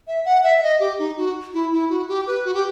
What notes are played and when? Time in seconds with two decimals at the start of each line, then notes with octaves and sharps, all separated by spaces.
0.07 E5
0.25 F#5
0.44 E5
0.58 E5
0.63 D#5
0.80 G4
0.99 D#4
1.17 F#4
1.54 E4
1.72 E4
1.89 F#4
2.08 G4
2.27 B4
2.45 F#4
2.54 G4